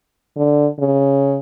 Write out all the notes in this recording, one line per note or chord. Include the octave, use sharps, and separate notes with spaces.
D3
C#3